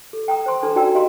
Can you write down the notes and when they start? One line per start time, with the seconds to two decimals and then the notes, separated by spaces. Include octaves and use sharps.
0.13 A4
0.28 G5 A#5 D#6
0.46 C5 C6
0.63 D4 A4 B4 A#5
0.76 D#4 F#4 D5 G5 A#5 E6
0.95 G4 D#5 F5 A#5 C6